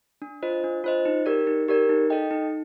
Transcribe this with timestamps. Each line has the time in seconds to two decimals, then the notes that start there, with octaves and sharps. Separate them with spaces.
0.22 D4
0.43 F4 C5 D#5
0.64 D4
0.84 F4 C5 D#5
1.05 D#4
1.26 G4 A#4 D5
1.47 D#4
1.68 G4 A#4 D5
1.89 D#4
2.10 A4 D#5 G5
2.31 D#4